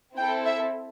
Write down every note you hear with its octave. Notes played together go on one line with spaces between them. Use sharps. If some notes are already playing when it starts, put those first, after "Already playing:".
C4 E4 A4 G5
E5